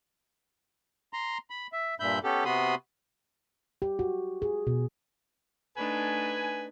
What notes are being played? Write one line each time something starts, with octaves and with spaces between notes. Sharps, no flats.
A#5 C6
B5
E5
G2 A#2 E5 B5 G6
B3 C#4 G4 A4
C3 B3 F#4 B5 C6 D#6
G4
F#4
G#4
B2
A3 D4 D#4 B4 G#5